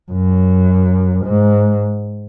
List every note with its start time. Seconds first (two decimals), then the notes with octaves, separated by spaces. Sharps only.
0.12 F#2
1.25 G#2